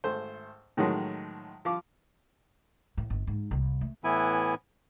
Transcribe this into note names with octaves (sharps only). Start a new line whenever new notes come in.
G#1 A3 C5
A2 D#3 F3 F#3 G#3
F3 F5 D6
A2
G1
G#2
C2
A3
A2 E3 B3 E4 G#5